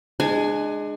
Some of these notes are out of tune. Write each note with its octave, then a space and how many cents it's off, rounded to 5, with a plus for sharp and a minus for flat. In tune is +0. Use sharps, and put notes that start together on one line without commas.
G#3 +0 D4 +30 G#5 +10